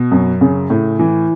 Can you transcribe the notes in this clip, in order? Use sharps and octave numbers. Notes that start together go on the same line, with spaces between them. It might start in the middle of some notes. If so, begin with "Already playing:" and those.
Already playing: B2
F#2
C#3
A2
E3